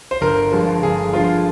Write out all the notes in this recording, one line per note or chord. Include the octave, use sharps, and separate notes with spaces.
C5
G1 A#4
G2 D3 F3 G#3
G1 G#4
G2 D3 F3 G#3 F4